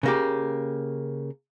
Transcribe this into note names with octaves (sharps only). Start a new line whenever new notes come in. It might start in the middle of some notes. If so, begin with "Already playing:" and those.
C#3 A#3 G4